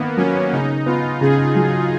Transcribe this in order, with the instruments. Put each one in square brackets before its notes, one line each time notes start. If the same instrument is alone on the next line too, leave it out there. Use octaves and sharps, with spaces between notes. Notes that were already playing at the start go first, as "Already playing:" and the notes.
Already playing: [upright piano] D#3 [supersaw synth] A#3 B3
[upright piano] F#3 [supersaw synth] C#4
[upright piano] C#3 [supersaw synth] D#4
[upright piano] B3 [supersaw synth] F4
[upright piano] C#3 [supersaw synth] G#4
[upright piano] F#3